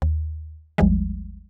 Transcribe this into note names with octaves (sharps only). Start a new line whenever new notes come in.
D#2
G#1 D#2 F3 G3 G#3